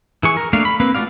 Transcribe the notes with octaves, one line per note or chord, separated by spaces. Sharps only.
E3 G#4 C#6
A#4
A3 A#3 D4 F5
B5
A#3 C4 B4
A3 F4 F#4 D5 F5